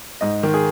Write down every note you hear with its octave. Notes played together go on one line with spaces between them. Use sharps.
G#2 D#5
D#3
G#4